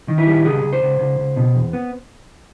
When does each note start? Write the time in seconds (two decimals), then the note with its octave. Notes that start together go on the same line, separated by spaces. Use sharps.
0.08 D#3
0.18 E4
0.27 G3
0.45 C#2 G#4
0.63 C#2
0.73 C5
0.82 C#2
0.99 C#2
1.19 C#2
1.36 B2
1.55 E2
1.73 B3